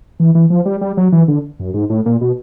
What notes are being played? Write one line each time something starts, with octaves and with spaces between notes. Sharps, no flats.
E3
E3
F3
G3
G3
F#3
E3
D3
F#2
G#2
A2
A#2
B2